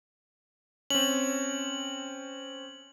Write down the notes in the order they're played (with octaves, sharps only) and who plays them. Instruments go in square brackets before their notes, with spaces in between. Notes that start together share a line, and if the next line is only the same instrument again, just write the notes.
[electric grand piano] C4 C#4 [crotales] F#7